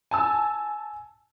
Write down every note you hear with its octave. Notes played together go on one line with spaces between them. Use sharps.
G#5 A5 E6